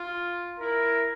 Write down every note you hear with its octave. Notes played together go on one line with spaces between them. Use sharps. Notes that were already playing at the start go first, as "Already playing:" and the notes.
Already playing: F4
E4 A#4